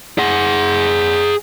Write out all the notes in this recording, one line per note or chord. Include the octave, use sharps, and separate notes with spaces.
G#4 F#5